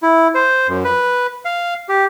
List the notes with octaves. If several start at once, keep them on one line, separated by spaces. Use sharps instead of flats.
E4
C5
F#2
B4
F5
G4